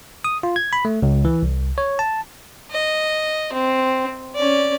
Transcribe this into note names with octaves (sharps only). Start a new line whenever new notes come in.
D#6
F4
G#6
B5
A3
C#2
E3
C2
C#5
A5
D#5
C4
C#4 D5